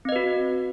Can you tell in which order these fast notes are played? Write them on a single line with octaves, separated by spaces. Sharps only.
C4 D#5 B4 F#4